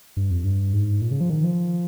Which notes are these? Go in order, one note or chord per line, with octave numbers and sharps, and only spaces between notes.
G2
F2
G2
G#2
A#2
C#3
F3
D#3
F3